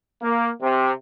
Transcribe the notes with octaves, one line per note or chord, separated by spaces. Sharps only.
A#3
C3